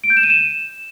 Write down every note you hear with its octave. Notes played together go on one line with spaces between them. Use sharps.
D7
G6
E7
D#7
E7